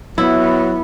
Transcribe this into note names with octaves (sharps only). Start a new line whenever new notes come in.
F#3 B3 E4